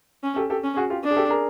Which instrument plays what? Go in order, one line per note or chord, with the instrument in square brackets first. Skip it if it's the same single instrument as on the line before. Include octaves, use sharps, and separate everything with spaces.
[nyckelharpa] C#4
[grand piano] G4 A4
G4 A4
[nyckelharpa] C#4
[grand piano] F#4 G#4
F4 G4
[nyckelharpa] D4
[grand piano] G#4
G4 A4
G#4 A#4